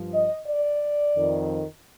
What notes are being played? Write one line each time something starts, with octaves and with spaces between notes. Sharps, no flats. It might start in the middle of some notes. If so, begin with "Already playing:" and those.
Already playing: G2 F3
D#5
D5
F2 D#3